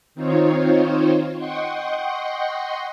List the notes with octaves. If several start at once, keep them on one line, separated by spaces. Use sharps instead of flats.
D#3 C4 D#4 F4 C5 C#5
D#5 F#5 G5 C6 C#6